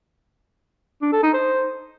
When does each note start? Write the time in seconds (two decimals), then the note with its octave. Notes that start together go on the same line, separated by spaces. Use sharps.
1.02 D4
1.13 A4
1.23 D#4
1.34 C5